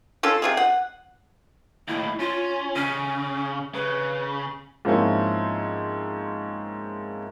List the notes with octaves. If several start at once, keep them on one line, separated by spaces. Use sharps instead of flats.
C#4 F4 A4
C3 F4 G#4
F#5
D#2 A2 E4
C#4 F4
C#3 C#4
C#3 B4
G#2 F3 A#3 C4 C#4 E4